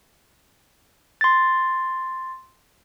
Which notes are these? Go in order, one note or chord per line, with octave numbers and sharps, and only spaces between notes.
C6 A6